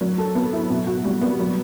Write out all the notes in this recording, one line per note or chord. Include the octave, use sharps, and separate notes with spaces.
F#3
A4
B3
E4
B2
F#4
G3
B3
F#3